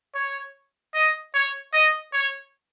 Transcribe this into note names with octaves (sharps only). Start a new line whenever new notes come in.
C#5
D#5
C#5
D#5
C#5